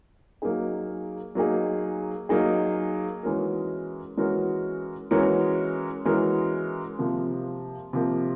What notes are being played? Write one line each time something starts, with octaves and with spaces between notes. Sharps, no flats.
F#3 A#3 D#4 G#4
F#3 A#3 D#4 G#4
F#3 A#3 D#4 G#4
E3 G#3 C#4 F#4 A#4
E3 G#3 C#4 F#4 A#4
E3 G#3 C#4 F#4 A#4
E3 G#3 C#4 F#4 A#4
C3 F3 A#3
C3 F3 A#3